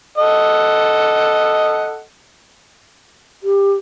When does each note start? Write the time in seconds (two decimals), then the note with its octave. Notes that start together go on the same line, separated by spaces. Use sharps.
0.18 A4 D#5 F#5
3.43 G4